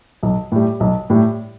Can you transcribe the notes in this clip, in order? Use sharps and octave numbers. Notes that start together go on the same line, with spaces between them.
B1
A2 G3
B1
A2 G3